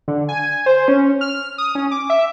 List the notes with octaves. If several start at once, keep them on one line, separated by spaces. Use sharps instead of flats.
D3
G#5
C5
C#4
F6
D#6
C#4
D6
E5